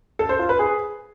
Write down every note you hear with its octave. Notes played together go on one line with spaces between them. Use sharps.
A4
C5
F4
B4
G#4